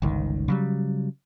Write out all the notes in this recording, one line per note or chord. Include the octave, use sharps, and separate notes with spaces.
G1 C#2 D#3
C#3 F#3 G3